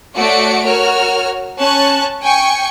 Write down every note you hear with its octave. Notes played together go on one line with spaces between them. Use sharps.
A3 F#4 C#5 D5 C#7 D7
F#4 A#4 C#5 F6
C#4 A5 C#6 F#6
G5 G#5 C#6 C#7